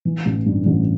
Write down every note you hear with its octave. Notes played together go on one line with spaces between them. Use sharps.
E3
A1
G2
A1